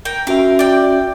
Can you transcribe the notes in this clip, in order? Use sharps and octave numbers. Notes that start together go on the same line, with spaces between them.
A#4 G5
C#4 F#4 A#4 E5 F5
D5 G5